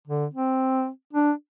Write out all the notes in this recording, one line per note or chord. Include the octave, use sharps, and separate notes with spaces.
D3
C4
D4